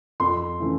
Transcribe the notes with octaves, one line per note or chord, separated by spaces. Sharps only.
F2 C6
C#3 E3 A3